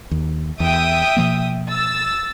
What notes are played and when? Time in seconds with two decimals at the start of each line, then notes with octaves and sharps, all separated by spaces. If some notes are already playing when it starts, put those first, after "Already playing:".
0.11 D#2
0.60 E2 E5 G5 D#6
1.17 B2 F3 A#3
1.69 E6 A6